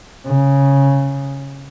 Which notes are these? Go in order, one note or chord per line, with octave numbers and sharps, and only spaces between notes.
C#3